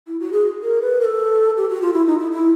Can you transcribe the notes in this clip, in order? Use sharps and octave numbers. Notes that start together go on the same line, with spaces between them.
E4
F#4
G#4
A#4
B4
A#4
A4
G4
F#4
F4
E4
D#4
E4
E4